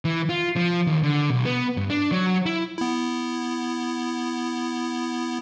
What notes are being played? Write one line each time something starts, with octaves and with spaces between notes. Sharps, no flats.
E3
F4
F3
D#2
D3
B1
B3
G2
D4
F#3
E4
B3 E4